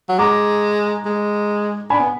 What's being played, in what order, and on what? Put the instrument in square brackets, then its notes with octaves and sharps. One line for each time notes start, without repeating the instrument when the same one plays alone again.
[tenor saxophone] F#3
[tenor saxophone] G#3 [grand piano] A#5 D6
[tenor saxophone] G#3
[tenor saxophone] D4 [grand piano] G#5 B5
[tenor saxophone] B3